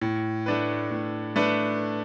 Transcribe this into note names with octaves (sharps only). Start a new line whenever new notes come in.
A2
A3 D4 B4
A2
A3 D4 B4